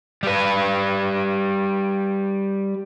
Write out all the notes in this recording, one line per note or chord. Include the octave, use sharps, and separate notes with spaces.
G3 B4